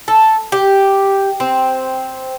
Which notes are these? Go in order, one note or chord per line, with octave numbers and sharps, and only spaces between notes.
A4
G4
C4